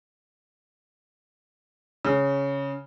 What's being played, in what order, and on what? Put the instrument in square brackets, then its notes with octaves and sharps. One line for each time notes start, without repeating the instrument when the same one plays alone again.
[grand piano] C#3